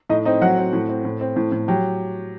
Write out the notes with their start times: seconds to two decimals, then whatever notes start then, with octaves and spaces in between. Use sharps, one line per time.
0.10 A2 D#4 D#5
0.25 C4 D#4 D#5
0.41 F#3 F#4 F#5
0.58 C4
0.73 A2
0.89 C4
1.05 A2
1.21 C4
1.36 A2
1.52 A2
1.68 F#3 G4 G5